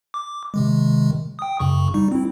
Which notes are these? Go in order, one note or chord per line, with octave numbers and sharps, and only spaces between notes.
D6
C3 D#3 G#3
G5 D#6
F#2 C#3 C#6
G3 D#4
C4 E4